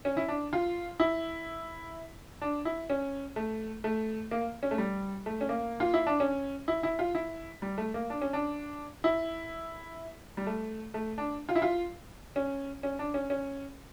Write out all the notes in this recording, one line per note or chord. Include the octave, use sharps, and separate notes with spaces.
C#4
E4
D4
F4
E4
D4
E4
C#4
A3
A3
A#3
C#4
A3
G3
A3
C#4
A#3
F4
E4
D4
C#4
E4
E4
F4
E4
G3
A3
A#3
D4
C#4
D4
E4
G3
A3
A3
D4
F4
E4
F4
C#4
C#4
D4
C#4
C#4